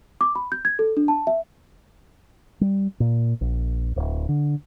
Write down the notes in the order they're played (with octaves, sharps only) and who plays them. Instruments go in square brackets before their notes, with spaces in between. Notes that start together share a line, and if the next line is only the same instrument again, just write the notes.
[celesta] D6
B5
G6
G#6
A4
D4
A5
E5
[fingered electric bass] G3
A#2
A#1
D1
D3